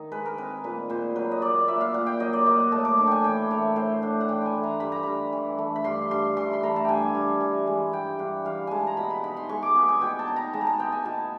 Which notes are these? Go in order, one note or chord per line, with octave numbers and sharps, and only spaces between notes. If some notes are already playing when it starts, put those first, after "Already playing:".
Already playing: D#3 D#4
G#3 B4
A#4
C4 B4
A#2 B4
A#2 C5
F#3 B4
D#5
A#3 D5
A#2 E5
F5
A#2 F#5
G5
F#3 D#5
D5
A#3 D#5
F#5
A2 A5
D6
D4 C#6
G5 G#5
E3 G5
A3 C#5
A2 C5
D4 F#5
F#5
E3 G5
G5 G#5
A3
A#5
G2 B5
A#5
G2 B5
E3
A3
B5
G2 C6
G2 C6
E3 C6
B5
A3 A#5
A5
G2 G5 G#5
G2
E3
G#3
G2 G5
G2 F#5
E3 F5
G#3 G#5 A5
A#5
B2 B5
B5
D#4 B5
C6
G#3 C#6
D6
B3 C#6
G#5
B2 G5
A5
D#4
A#5
G#3 A5
A#5
A5
B3 G5
G#5
B2 A5